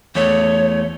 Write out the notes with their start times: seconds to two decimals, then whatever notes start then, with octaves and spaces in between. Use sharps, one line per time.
0.15 E2 A3 C#5